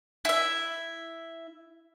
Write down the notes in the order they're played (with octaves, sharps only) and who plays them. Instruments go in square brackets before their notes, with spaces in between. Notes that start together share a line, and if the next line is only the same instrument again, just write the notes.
[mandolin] E4 E5